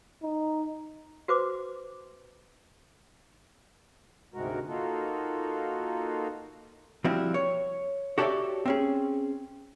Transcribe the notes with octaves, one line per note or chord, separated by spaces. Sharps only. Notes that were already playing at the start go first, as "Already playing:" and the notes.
D#4
F#4 B4 C5 D6
D2 G#2 C3 G#3 F#4 A#4
A#3 D#4 F4 F#4 A4
F3 G3 C4 E4 F#4
C#5
F#4 G4 A4 C#5 D5 E5
C4 C#4 G#4